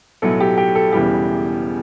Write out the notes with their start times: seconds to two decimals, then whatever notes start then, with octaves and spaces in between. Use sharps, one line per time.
0.22 B1 A2 F#3 A4
0.40 G4
0.57 G4
0.75 A4
0.92 E1 E2 C#3 E3 G3 G4